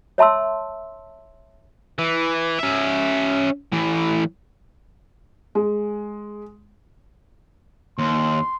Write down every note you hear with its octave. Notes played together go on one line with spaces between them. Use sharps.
C#5 E5 A5 C6 E6
E3
C#4 E5
A2 E3
G#3
D#2 C6